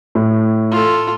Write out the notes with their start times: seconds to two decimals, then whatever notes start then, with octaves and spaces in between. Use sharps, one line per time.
0.15 A2
0.71 F4 A4